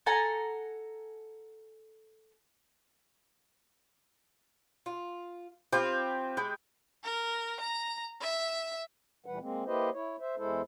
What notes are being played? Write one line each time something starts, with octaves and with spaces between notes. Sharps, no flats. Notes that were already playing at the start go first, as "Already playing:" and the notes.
A4 F#5 G#5 A#5
F4
C4 F4 G4 G5 B5
G#3 G5 B5
A#4
A#5
E5
D2 A#2 E3 G3 B4 F#5
G#3 A#3 C4
A#3 E4 G4 B4 C5 D#5
E4 C#5
C5 E5
E2 G#3 E4 A4 C5